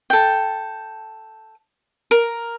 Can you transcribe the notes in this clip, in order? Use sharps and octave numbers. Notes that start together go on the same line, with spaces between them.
A4 G5
A#4